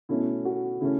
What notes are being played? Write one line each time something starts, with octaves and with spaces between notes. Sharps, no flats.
B2 A3 C#4 E4
F#4
C#3 A3 C#4 E4